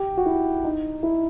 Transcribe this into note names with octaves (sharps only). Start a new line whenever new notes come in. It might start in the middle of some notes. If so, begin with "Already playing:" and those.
Already playing: G4
F#4
E4
D#4
E4